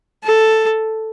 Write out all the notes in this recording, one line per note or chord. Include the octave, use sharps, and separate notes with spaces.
A4